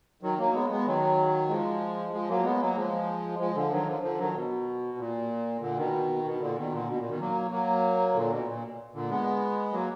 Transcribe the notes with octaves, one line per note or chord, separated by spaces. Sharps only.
D#3 F#3
F#3 A#3
G#3 B3
G#3 B3
D#3 F#3
F3 G#3
F3 G#3
F#3 A#3
G#3 B3
F#3 A#3
F3 G#3
F3 G#3
D3 F3
D#3 F#3
D3 F3
D3 F3
D#3 F#3
B2
A#2
A#2 D3
B2 D#3
B2
A#2 D3
B2 D#3
A#2 D3
B2
A#2
B2 D#3
F#3 A#3
F#3 A#3
A#2 D3
B2
A#2
A#2 D3
G#3 B3
F#3 A#3